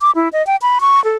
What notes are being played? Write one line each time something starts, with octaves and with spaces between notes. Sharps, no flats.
D6
E4
D#5
G5
B5
C#6
A4